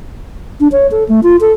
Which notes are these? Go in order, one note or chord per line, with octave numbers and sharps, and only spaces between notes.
D4
C#5
A4
A3
F4
A4